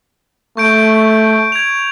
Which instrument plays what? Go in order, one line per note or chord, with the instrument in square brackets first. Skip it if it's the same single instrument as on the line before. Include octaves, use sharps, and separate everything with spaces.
[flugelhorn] A3 [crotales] C#6 G6 D7
[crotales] G#6 F7